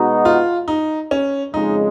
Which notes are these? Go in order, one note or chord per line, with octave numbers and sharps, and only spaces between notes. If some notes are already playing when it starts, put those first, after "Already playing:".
Already playing: B2 G#3 B3 D#4 F#4
F4
D#4
C#4
F2 C#3 G#3 D#4